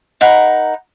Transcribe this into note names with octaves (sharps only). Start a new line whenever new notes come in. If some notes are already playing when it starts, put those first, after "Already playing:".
D#4 A#4 F#5 B5